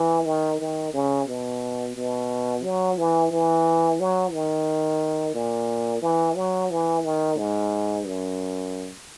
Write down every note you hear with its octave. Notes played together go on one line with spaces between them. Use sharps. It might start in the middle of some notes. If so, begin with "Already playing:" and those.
Already playing: E3
D#3
D#3
C#3
B2
B2
F#3
E3
E3
F#3
D#3
A#2
E3
F#3
E3
D#3
G#2
F#2